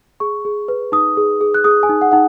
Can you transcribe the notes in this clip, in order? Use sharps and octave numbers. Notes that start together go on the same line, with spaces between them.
G#4 C#6
G#4
B4
D#4 D#6
G#4
G#4
F#6
G#4 D#6
G#5
D#4
F#5
D#4 F#5